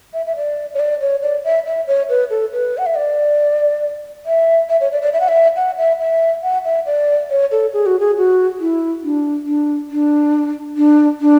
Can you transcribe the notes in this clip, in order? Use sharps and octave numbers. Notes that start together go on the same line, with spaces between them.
E5
E5
D5
C#5
D5
C#5
D5
E5
E5
C#5
B4
A4
B4
F#5
E5
D5
E5
E5
C#5
D5
D5
E5
F#5
E5
F#5
E5
E5
F#5
E5
D5
C#5
A4
G#4
F#4
G#4
F#4
E4
D4
D4
D4
D4
D4